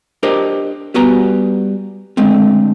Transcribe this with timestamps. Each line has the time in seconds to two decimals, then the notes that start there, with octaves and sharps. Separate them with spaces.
0.23 D4 G4 A#4 C5 D#5
0.94 G3 B3 F#4 B4 G#5 A#5
2.17 D3 G#3 A3 C4